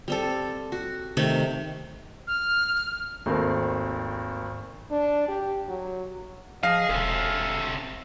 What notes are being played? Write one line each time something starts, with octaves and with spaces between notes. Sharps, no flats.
G3 C4 A4
F#4
C3 D#3 A3
F6
G#1 D#2 A3 C4 A#4
D4
G4
F#3
F3 G#4 D#5 F5
E1 C3 C#4 A4